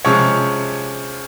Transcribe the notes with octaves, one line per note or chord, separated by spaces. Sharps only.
C3 F3 G#3 C#4 C#5